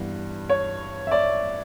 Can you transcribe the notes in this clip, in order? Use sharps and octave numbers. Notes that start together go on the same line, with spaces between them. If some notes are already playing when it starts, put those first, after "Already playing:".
Already playing: G2 E3 B3
C#5
E5
D5